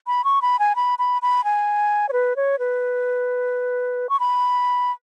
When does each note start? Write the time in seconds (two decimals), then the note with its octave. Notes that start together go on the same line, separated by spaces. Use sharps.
0.07 B5
0.24 C#6
0.42 B5
0.59 G#5
0.76 B5
0.99 B5
1.22 B5
1.44 G#5
2.09 C#5
2.13 B4
2.36 C#5
2.59 B4
4.09 C#6
4.20 B5